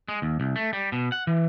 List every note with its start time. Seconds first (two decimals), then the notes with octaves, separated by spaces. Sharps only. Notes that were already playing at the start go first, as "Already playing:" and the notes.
0.08 G#3
0.22 D#2
0.40 C2
0.56 A3
0.73 G3
0.92 B2
1.12 F#5
1.27 E3